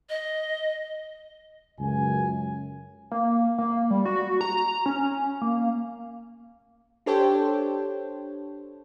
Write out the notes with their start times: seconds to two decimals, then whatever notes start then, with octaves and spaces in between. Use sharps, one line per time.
0.10 D#5
1.80 C#2 F#2 G#5
3.12 A#3
3.58 A#3
3.91 G3
4.06 F#4
4.41 A#5
4.86 C#4
5.42 A#3
7.06 D4 G4 A4 C5 C#5 G5